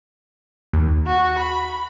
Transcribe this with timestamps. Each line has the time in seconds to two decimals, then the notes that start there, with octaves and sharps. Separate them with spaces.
0.73 D#2
1.07 F#4
1.39 B5